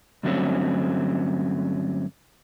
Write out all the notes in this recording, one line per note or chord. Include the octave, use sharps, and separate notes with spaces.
G2 D3 F#3 A3 C4 C#4